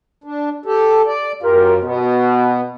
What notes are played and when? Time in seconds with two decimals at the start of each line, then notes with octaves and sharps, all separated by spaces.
0.24 D4
0.66 G4 A4
1.07 D5
1.43 F#2 F4 G4 A#4
1.84 B2 B3